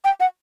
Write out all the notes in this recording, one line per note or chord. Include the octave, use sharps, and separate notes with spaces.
G5
F#5